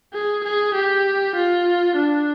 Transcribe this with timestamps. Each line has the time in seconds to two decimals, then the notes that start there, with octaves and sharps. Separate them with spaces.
0.14 G#4
0.45 G#4
0.75 G4
1.36 F4
1.96 D4